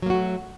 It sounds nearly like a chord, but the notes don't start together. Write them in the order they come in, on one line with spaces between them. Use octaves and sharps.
F#3 A#3 F#4 A3